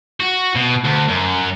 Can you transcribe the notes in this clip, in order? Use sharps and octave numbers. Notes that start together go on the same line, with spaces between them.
F#4
B2
D2
F#2